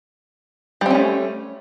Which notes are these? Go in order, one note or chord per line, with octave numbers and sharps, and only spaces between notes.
G3 A3 C4 C#4